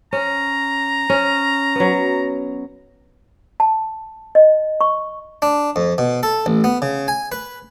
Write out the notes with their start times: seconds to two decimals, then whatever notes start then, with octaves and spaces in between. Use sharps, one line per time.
0.13 C#4 A#5
1.10 C#4
1.75 F#3 B3
3.60 A5
4.35 D#5
4.81 C#6
5.42 D4
5.76 F2
5.98 B2
6.23 A4
6.46 A1
6.64 B3
6.82 C#3
7.08 G#5
7.32 B4